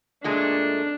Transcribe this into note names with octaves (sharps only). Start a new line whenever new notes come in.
A#2 G#3 A3 D4